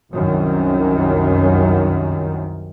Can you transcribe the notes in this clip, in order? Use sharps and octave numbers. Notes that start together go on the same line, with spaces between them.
C2 F#2 D#3